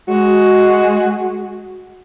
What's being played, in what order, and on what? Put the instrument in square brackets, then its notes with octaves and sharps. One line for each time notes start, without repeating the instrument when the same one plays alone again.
[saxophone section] G#3 F#4